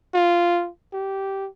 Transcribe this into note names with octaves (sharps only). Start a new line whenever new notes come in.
F4
G4